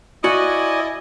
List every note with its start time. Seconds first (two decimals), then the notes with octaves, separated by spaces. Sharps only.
0.24 E4 F#4 D5 D#5 G#5